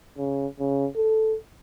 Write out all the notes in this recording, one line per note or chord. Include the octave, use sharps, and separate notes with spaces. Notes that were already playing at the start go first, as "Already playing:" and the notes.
C#3
C#3
A4